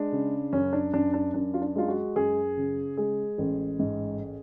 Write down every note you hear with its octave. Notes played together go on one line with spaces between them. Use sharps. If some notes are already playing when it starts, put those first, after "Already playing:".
Already playing: G#3 D4
C#3
F#2 C#4
D4
F#2 D4
D4
F#2 D4
F4
D4
G#3 F4
F#4
F#2 G#4
C#3
G#3 G#4
A1
G#2